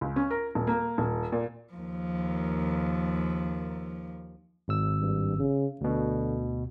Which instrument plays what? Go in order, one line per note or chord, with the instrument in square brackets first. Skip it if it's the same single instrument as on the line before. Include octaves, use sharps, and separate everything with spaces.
[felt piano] C#2
C#4
A#4
D#1
A#3
D#1
A#2
[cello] D#2 F3
[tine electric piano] G#1 E6
[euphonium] G2
C#3
[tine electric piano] D2 B2 [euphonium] D3